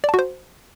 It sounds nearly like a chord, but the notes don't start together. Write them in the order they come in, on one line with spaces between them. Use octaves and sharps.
D5 A5 F#4 C5